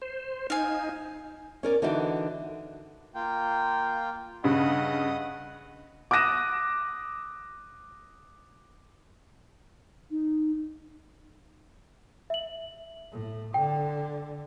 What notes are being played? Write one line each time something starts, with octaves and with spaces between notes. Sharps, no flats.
C5
D#4 F5 G#5
C#4 A#4 D5
D3 E3 D#4 F#4 D5
A#3 F4 G5
G2 C#3 D#5 F#5 D#6
D6 D#6 F#6 A#6 D#7 E7
D#4
E5 F#7
A2
D3 G5